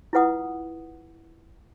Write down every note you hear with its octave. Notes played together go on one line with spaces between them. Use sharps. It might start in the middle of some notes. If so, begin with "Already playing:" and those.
E4 F4 B4 F#5 D#6